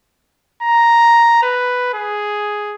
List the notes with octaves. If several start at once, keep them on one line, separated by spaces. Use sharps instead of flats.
A#5
B4
G#4